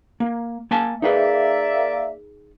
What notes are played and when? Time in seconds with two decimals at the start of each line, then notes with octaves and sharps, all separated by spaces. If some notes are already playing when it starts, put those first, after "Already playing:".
0.20 A#3
0.71 A#3 G#5 A5
1.02 A#3 D#4 G#4 B4 D5 E5